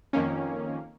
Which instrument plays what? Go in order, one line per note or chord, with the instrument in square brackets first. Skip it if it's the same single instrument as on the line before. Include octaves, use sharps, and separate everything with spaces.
[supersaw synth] F2 D#3 A#3 C#4